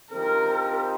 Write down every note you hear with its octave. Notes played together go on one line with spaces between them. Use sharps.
F3 C4 D#4 G4 A#4